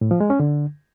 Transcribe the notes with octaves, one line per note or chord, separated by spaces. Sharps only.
A2
F3
G#3
C#4
D3